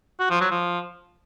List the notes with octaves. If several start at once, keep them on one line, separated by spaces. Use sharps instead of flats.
F#4
F3
F#3
F3